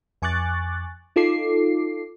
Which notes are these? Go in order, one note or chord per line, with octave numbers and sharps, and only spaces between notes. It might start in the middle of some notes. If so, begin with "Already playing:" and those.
F2 G#5 C#6 D6 F#6 A6
D#4 F4 A4 D6 C7